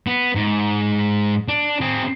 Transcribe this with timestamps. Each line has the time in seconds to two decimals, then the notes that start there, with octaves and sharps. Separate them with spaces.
0.07 B3
0.35 G#2
1.48 D4
1.81 C4 G#4